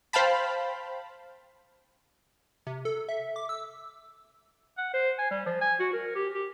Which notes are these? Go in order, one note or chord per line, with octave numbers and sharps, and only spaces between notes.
C5 F5 G5 A5 B5
C3
A4
E5
D6
E6
F#5
C5
G#5
G3
F3
G#5
F#4
A#4
G4
G4